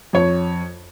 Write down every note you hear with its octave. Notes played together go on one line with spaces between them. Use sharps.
F2 C#5